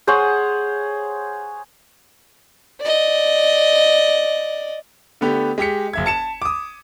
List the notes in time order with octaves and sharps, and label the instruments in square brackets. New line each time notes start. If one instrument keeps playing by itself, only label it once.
[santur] G#4 C5 C#5 F#5
[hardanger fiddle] D5 D#5
[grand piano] D3 A3 B3 G4
G#3 G4 B6 C#7
F#1 E5 G#6
A5 C#7 E7
D6 D#6